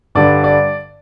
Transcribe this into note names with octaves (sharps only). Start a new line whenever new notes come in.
G2 D3 G3 D5
D5